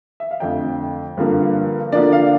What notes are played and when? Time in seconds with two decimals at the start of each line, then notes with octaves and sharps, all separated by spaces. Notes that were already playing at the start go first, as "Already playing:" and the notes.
0.20 E5
0.31 F5
0.40 F2 D3 A3 G5
1.17 G2 D3 F3 A#3
1.92 D3 F3 A#3 D4 D5
2.13 F5